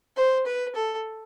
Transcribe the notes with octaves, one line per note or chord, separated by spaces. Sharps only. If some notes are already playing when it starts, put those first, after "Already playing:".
C5
B4
A4